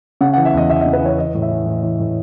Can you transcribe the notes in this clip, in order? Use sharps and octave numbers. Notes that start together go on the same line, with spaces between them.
C#3 F#5
F#5
E3
E5
E2 D#5
E2 E5
D#5
C#3
B4
E3 C#5
E3 D#5
A2
E5
E3
A2
E3
A2